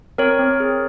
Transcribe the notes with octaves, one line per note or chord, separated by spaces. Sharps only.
C4 A#4 C#5
C4
G#4